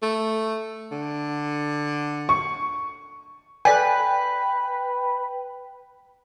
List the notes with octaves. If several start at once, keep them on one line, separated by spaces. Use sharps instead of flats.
A3
D3
C#6
A4 B4 D5 G5 G#5